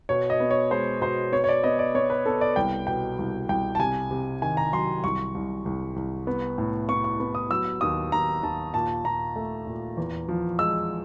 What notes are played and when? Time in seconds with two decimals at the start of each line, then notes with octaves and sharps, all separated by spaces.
0.09 B2 C#5
0.30 D#5
0.40 B3
0.51 C#5
0.71 G#3 C5
1.01 B2 C5
1.32 B3 C#5
1.44 C#5
1.49 D5
1.64 B3 D#5
1.79 D5
1.94 B3 C#5
2.10 B4
2.26 B3 A4
2.41 D5
2.56 C2 G5
2.87 B2 G5
3.19 C2
3.49 C2 G5
3.75 A5
3.79 C3 G#5
4.11 C3
4.42 D#3 G#5
4.57 A#5
4.73 F#3 C6
5.04 C2 C#6
5.35 C2
5.65 C2
5.96 C2
6.27 B3
6.58 A2
6.88 B3 C#6
7.04 C#6
7.20 B3
7.35 D#6
7.51 F#3 E6
7.81 D#2 D#6
8.12 D#2 A#5
8.43 D#2 A5
8.74 A#2 A5
9.04 A#2 A#5
9.36 A3
9.67 A#2
9.97 E2
10.28 F3
10.59 G#3 E6